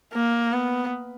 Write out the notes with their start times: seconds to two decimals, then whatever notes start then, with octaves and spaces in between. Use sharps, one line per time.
0.14 A#3
0.52 B3